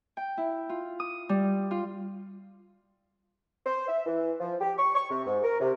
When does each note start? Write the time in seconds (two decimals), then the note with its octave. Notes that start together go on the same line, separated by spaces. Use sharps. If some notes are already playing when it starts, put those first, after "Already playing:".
0.17 G5
0.37 E4
0.69 F4
1.00 D#6
1.29 G3
1.71 F4
3.66 C5
3.88 E5
4.06 E3
4.40 F3
4.61 G4
4.79 C#6
4.95 C#6
5.10 C3
5.26 G#2
5.44 A#4
5.60 C3